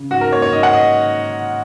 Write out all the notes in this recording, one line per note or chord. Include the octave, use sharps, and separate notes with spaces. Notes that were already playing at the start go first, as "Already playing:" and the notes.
Already playing: C#3
G#2 F#4
A#4
A#3 C#5
C#5
G#2 D#5
F#5
D#5